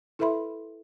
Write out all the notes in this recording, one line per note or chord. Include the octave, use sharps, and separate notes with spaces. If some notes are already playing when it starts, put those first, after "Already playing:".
E4 A4 B4 E5 B5 C6